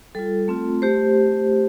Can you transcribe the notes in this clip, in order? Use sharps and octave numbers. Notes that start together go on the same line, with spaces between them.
G3 F4 A4
A3 C4 F4
A3 G4 C5